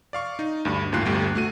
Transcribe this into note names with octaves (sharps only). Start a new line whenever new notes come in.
D5 F5 C#6
D#4
D2 G2 B5
G1 D#2 A2 F4 F#6 C7
G1 D2 G3 G5
A3 F#4 D#7